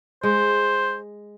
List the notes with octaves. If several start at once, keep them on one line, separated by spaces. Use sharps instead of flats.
G#3 C5